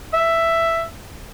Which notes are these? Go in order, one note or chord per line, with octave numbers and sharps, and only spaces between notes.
E5